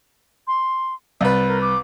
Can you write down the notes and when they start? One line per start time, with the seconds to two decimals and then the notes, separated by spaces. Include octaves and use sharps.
0.47 C6
1.21 C2 B4 D5
1.48 A#4
1.61 D6